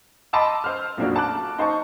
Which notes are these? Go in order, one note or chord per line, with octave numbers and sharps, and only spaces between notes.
D#5 A5 B5 C6 D6 E6
C5 F6
A#1 F2 A#3 D4 F#4
A5 D6 F#6
D#4 C5 A5 C#6